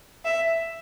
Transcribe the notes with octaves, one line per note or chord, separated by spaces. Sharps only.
E5